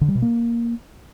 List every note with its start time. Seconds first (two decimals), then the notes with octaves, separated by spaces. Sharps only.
0.01 D3
0.08 G3
0.15 B2
0.22 A#3